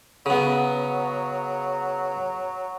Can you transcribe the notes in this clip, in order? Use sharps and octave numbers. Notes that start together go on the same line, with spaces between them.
C#3 F#3 B3